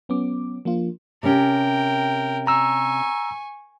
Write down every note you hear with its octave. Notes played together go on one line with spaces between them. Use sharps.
F#3 B3 C#4 D6
F3 A#3 D4 F4
C3 C#4 A#4 G5
G#5 A#5 C#6 E6